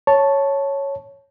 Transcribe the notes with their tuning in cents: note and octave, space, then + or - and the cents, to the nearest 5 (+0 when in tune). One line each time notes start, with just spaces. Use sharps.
C#5 +0 A5 +0